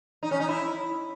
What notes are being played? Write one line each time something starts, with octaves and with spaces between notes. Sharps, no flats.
D#4
C#4
D#4
E4